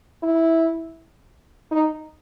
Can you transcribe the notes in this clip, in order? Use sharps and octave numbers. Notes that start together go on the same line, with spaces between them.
E4
D#4